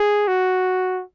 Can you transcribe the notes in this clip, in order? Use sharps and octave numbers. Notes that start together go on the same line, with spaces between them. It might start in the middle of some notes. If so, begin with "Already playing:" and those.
Already playing: G#4
F#4